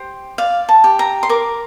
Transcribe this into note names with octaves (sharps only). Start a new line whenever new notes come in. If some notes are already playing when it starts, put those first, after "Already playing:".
Already playing: G4 C5
D5 F5
A5
G4
A#5
C6
A#4 D6